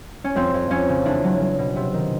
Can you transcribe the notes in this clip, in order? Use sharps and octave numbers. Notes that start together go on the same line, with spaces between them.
C#4
F2 C4
F2
F2 C#4
C#3
E2 D4
F#3
F#3
B2
C3
D#3